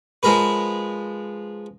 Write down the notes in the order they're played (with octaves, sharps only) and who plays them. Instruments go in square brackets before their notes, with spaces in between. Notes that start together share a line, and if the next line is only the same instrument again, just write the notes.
[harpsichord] F3 G#3 G#4 A#4 B4